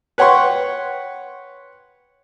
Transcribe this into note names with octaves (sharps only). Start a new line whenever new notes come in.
B4 C#5 F#5 G5 C6 C#6